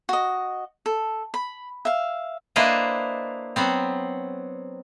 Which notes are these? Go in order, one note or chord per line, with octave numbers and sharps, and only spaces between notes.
F#4 D#5
A4
B5
E5 F5
A#3 D4 E4 B4 C5 D#5
F#3 B3 C4